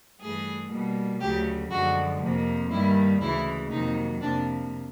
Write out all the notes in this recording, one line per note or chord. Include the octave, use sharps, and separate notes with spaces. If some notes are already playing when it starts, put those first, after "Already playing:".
G2 E3 A3 G#4
B2 G3 A#3
D2 C#3 F#3 A3 G4
F#2 D3 F3 G#3 F#4
F2 C3 F3 A#3
G2 D#3 G3 A#3 E4
D2 C#3 E3 G#3 E4
F2 C3 D#3 F#3 A#3 D#4
F2 C3 F3 A#3 D4